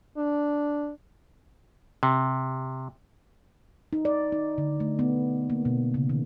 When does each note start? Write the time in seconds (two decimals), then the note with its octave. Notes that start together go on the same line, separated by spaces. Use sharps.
0.17 D4
2.03 C3
3.93 D#4
4.05 D5
4.32 D#4
4.58 D3
4.80 A3
4.99 B3
5.50 A#3
5.65 B2
5.94 C#3
6.09 D#3